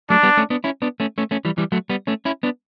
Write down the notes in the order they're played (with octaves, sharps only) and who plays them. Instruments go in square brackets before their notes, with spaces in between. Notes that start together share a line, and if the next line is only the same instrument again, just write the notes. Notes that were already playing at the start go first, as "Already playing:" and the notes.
[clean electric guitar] F#3 A3 [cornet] D4
[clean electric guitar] G3 B3
A3 C#4
B3 D4
C#4 E4
B3 D4
A3 C#4
A3 C#4
A3 C#4
E3 G3
E3 G3
F#3 A3
G3 B3
A3 C#4
C#4 E4
B3 D4